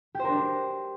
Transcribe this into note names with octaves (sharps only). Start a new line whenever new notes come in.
D4 G4 A#4 C5